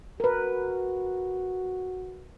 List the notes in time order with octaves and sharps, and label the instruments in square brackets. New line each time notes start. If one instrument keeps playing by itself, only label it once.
[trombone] F#4 [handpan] A#4 B4